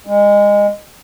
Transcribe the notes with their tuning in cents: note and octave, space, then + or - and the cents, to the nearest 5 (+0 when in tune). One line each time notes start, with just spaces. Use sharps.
G#3 -20